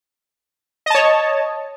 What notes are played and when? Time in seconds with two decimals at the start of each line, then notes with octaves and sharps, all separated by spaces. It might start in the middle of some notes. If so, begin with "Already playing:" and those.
0.86 D#5
0.90 A5
0.95 C#5